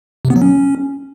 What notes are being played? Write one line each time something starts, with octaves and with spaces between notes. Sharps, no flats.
C3
B3
F#3
C#4